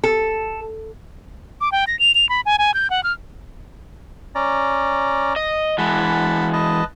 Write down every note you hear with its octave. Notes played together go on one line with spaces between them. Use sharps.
A4
D6
G5
A#6
F7
F7
B5
G#5
G#5
G6
F#5
F6
C#4 D5 A#5
D#5
E3 G#3 F#5 A5 B5
B4 D#5 A5